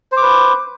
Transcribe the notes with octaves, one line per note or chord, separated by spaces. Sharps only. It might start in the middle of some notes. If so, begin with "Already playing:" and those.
B4 C5 D6